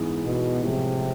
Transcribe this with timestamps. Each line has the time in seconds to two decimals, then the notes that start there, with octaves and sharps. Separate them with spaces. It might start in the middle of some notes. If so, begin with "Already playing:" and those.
Already playing: G#2 E3 G#3 B3
0.25 B2
0.63 A2 C3 F3 G#3